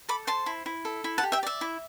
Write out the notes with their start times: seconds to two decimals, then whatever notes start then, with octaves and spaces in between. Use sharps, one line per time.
0.09 A4 B5 D6
0.27 C5 A5 C6
0.46 E4
0.66 E4
0.85 A4
1.04 E4
1.18 F#5 A5
1.23 G4
1.32 E5 G5
1.43 D5 E5
1.61 E4